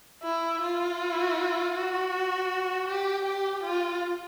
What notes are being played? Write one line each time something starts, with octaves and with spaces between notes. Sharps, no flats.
E4
F4
F#4
G4
G4
F4